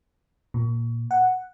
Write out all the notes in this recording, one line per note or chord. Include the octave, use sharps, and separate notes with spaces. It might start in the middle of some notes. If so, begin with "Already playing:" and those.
A#2
F#5